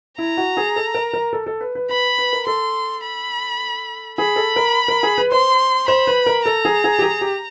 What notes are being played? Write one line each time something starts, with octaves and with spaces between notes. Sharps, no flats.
E4 A#5
F#4
G#4
A4
A#4
A#4
A4
A4
B4
B4
B4 B5
B4
A#4
A4 C6
B5
G#4 B5
A4
A#4
A#4
G#4
B4
C5 C6
C5 B5
B4
A#4
A4 A#5
G#4
G#4
G4
G#4
G4